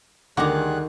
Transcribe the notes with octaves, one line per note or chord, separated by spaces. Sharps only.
D2 D#3 G3 G#4 F#5 A#5 D6 F#6